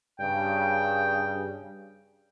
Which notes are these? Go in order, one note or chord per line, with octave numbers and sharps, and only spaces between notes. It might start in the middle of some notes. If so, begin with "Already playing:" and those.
G2 C#3 G5